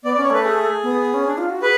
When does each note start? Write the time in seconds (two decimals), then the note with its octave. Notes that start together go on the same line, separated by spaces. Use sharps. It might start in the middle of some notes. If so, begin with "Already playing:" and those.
0.03 B3 D5
0.14 D5
0.17 C#4
0.23 C#5
0.30 A3 B4
0.44 G#4
0.83 B3
1.14 C#4
1.26 D4
1.38 F4
1.50 F#4
1.62 G#4 B4